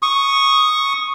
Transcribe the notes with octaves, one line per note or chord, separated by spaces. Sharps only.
C#6 D#6